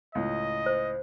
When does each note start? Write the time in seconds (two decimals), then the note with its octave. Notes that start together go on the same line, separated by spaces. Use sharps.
0.15 C#2 A2 D#5
0.66 C5